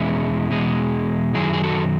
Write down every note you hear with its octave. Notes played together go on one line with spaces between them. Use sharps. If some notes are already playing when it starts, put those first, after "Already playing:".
Already playing: E2 B2 G#3 C#4 E4
E2 B2 G#3
F#2 D#3 F#3 E4 G#4
G#4
F#4 A4